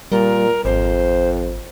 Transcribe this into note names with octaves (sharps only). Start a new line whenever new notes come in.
A#2 G3 A#4
G#1 F2 C5